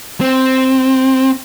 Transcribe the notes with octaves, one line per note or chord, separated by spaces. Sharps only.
C4